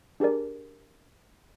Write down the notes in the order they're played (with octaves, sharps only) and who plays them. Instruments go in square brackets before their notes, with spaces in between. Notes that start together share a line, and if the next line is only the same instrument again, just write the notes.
[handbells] D4 G4 G#4 A#4 D5